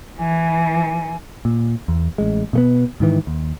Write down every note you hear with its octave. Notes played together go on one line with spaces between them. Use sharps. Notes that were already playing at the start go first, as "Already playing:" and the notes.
E3 G#5
A#2
E2
A1 G#3
B2 A3 B3
G#2 D#3 E3
D#2